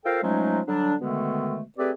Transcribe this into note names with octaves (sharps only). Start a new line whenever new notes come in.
F4 A4 A#4 C5 F5 G5
F3 F#3 G#3 A3 C#4 D#4
D3 F#3 G3 D4
B2 D3 D#3 G#3 A3 B3
A3 C4 G4 G#4 B4 D5